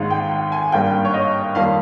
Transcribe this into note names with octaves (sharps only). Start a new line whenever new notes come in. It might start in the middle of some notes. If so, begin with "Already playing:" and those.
Already playing: G#1 G#2 D#3 G#3
G5
G5
G#5
G#1 G2 G3 A#3 G5
C#5
D#5
F2 D#3 G3 A#3 F5